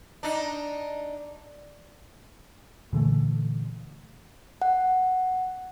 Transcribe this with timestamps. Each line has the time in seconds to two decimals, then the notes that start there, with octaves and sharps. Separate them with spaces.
0.23 D4 D#4
2.93 A#2 D3 E3 A3
4.62 F#5